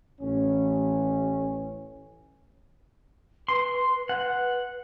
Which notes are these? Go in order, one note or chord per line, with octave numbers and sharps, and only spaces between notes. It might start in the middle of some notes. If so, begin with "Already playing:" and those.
A1 C#4
B4 C6
F#5